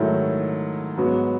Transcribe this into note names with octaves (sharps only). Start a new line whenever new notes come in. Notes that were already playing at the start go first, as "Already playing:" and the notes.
Already playing: G#2 D#3 F#3 A3 E4
G#2 F#3 B3 F#4